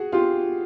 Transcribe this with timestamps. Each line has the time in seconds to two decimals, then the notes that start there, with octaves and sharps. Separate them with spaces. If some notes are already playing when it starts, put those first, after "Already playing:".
Already playing: F#4 G#4
0.12 F4 G4